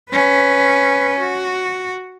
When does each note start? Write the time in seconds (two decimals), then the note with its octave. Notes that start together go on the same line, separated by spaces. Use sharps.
0.11 C#4 B4
1.20 F#4